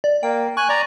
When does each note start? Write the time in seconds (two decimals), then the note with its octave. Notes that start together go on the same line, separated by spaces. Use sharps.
0.04 D5
0.23 A#3 G5
0.57 G#5 C#6 F#6
0.69 D5 A#5